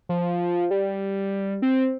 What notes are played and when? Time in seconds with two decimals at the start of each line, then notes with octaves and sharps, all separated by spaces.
0.09 F3
0.71 G3
1.62 C4